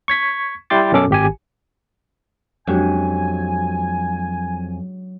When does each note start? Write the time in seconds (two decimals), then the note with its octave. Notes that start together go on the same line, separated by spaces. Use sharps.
0.08 C#6 G#6 B6
0.70 G3 E4 G5 C6 D6 A6
0.92 F#2 B2 C#4 A4 D6
1.10 G#1 G4 G#5
2.67 F2 F#3 G#3 C#4 D4 F#4 G4 G#5